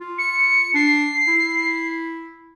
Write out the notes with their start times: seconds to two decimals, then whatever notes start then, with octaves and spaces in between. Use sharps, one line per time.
0.01 F4
0.18 C#7
0.74 D4 C7
1.28 E4